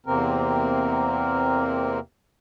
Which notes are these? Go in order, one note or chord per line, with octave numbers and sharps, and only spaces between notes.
E2 C3 A#3 C4 A#4